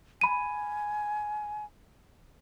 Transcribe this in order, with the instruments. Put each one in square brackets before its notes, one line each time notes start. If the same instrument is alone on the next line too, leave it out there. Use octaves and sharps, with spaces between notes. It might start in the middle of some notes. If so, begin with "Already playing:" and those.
[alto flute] G#5 [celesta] B5 D#7